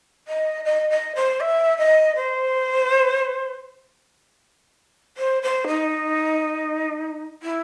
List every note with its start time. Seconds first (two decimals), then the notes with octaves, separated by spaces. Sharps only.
0.28 D#5
0.65 D#5
0.90 D#5
1.15 C5
1.40 E5
1.78 D#5
2.16 C5
5.17 C5
5.42 C5
5.67 D#4
7.43 E4